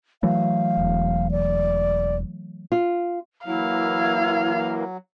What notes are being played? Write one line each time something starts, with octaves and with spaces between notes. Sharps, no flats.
E3 F#3 A3 F5
E1
D5
F4
E3 F#3 A#3 E4 F5